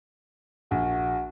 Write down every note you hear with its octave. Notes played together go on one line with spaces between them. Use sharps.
A#1 F#4